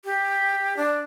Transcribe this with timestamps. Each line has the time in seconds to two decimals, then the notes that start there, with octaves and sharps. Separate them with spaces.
0.04 G4
0.76 D4